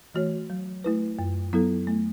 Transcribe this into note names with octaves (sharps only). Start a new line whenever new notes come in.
E3 A3 F#4 C#5
F#3
A3 E4 B4
F#2
F#3 B3 E4 A4
A3